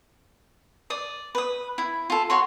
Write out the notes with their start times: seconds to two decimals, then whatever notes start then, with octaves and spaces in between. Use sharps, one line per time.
0.90 D5 D#6
1.35 B4 D#6
1.78 E4
2.10 F4 A4
2.30 F#4 C#5 C6